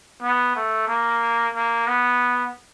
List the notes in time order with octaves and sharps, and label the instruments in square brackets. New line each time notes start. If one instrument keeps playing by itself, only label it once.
[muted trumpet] B3
A3
A#3
A#3
B3